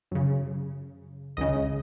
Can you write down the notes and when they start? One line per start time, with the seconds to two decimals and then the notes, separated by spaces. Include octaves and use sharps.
0.11 F#2 C#3
1.37 C#2 C#3 D#5